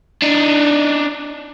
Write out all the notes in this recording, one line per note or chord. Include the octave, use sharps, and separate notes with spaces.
D4 D#4